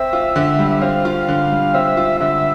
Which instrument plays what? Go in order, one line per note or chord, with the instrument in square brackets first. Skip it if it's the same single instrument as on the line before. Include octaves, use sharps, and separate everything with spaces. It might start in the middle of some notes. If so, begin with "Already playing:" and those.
Already playing: [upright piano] C4 [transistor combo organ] E5
[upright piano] F4
D3
G3
[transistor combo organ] E5
[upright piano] C4 [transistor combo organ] F5
[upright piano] F4
D3
G3
[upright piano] C4 [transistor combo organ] E5
[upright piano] F4
[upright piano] D3 [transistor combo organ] E5